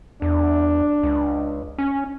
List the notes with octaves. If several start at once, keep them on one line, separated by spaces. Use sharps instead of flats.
E2 D4
C#2
C#4